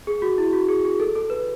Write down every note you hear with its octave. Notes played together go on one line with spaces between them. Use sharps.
G#4
F#4
E4
F#4
G#4
G#4
A4
A4
B4